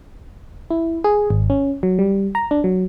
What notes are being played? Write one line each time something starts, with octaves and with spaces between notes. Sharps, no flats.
E4
G#4
G#1
C#4
F#3
G3
A#5
D4
F#3